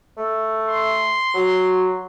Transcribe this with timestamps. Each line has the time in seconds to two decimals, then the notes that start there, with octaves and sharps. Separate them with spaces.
0.17 A3
0.68 C6
1.34 F#3